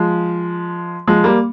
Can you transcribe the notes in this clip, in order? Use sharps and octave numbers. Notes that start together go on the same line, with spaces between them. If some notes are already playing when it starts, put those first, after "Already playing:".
Already playing: F3 G#3
F3 G#3
G3 A#3